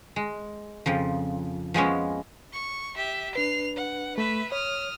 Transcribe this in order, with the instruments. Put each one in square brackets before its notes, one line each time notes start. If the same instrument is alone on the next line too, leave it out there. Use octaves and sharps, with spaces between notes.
[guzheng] G#3
F2 C#3 F3
F3 G#3 B3 C#4
[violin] C#6
G4 E5
[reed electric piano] D4 B4 [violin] C7 F7
[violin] F#5
[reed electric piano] A3 [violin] B4 E5
[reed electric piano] C#5 [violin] D#6 F6